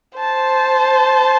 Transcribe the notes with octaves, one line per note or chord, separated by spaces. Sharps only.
C5 A5